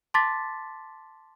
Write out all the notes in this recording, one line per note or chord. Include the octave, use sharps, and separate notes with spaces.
A5 C6 D6 A6 B6